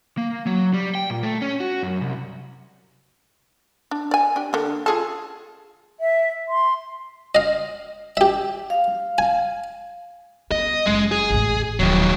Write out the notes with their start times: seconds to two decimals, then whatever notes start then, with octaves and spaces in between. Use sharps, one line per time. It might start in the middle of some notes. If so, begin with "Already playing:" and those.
0.18 A#3
0.47 F#3
0.74 G3
0.95 G5
1.10 A#2
1.23 A3
1.42 C#4
1.60 F#4
1.83 F#2
2.01 C2
3.91 D4
4.11 D5 G#5
4.36 D4 G4
4.53 D3 A#3
4.86 F4 G#4 A4
6.00 E5
6.49 C6
7.35 D#5 F5
8.17 G4 E5
8.70 F5
9.18 G#5
10.51 B3 D#5
10.87 F#1 G#3
11.12 G#4
11.30 A1 E2
11.79 D#1 D#3 F3 F#3